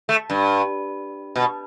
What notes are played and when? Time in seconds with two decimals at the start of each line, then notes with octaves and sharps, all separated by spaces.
0.09 A3
0.30 G2
1.36 B2